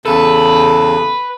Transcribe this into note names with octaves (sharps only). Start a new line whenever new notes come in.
E2 C#3 A4 B4